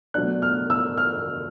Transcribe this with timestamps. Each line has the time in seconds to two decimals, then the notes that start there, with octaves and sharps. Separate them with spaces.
0.14 B2 F#3 A3 D4 F#6
0.42 F6
0.70 E6
0.97 F6